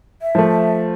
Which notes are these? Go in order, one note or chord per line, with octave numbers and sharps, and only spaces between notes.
E5
F3 A3